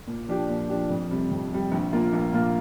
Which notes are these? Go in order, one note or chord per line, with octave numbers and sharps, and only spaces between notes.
A#2
F3 D4 G4
A#2
F3 D4 G4
F2
C3 G3
F2
C3 G3
A#1
A#2 A#3 F4
A#1
A#2 A#3 F4